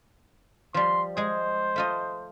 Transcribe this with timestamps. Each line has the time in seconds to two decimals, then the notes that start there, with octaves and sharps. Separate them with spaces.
0.74 F3 G3 C6
1.17 G#3 G#4 C5
1.76 A3 F4 D#5